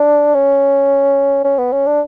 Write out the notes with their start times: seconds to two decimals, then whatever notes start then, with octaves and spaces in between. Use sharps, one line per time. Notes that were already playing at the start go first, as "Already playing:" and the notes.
Already playing: D4
0.35 C#4
1.45 C#4
1.58 B3
1.73 C#4
1.86 D4